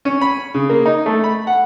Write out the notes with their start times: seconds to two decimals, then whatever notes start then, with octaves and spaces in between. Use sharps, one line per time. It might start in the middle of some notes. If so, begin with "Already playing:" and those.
0.05 C#4
0.21 B5
0.54 C#3
0.70 A#3
0.86 D#4
1.06 A3
1.24 B5
1.47 F#5